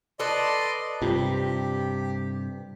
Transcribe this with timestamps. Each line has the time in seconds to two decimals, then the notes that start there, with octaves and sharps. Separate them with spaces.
0.20 A4 B4 D5 D#5 C6
1.02 G2 C3 F4 G4